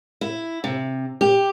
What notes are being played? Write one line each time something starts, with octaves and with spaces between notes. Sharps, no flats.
E4
C3
G4